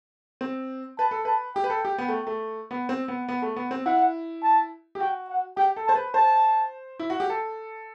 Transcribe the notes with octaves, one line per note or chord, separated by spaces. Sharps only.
C4
B4 A5
A4
B4 A5
G4 G5
B4
A4
G4
B3
A3
A3
B3
C4
B3
B3
A3
B3
C4
E4 F#5
A5
G4
F#4 G5
F#5
G4 G5
A4
C5 A5
B4
C5 A5
E4
F#4
G4
A4